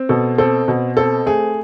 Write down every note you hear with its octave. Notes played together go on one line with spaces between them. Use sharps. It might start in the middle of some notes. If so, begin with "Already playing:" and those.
Already playing: C4
B2 A4
C4 A4
B2
C4 A4
A3 G#4